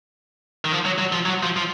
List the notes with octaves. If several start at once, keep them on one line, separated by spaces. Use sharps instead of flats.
D#3
F3
F#3
F#3
F3
F#3
F3
F3